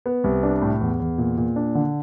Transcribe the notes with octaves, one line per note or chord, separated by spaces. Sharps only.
B3
C2
D4
A2
E2
E2
A#2
A#2
D4
D3